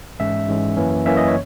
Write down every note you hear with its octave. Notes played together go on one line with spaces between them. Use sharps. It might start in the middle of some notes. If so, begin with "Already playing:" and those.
G#2 E3 G#3 C#4 E5
G#2 E3 G#3 C#4
F#2 E3 A#3 C#4
F#2 E3 A#3 C#4 E5
D#5
C#5